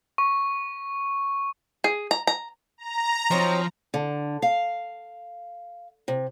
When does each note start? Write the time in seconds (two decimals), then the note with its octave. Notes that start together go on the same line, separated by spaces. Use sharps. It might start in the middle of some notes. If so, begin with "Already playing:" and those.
0.18 C#6
1.84 G#4
2.11 A#5
2.27 A#5
2.78 A#5
3.31 F3 F#3 C4 D#4
3.94 D3
4.42 F5
6.08 C3